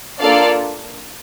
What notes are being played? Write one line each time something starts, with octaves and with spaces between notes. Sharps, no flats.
A#3 D4 F4 A4 D5 F5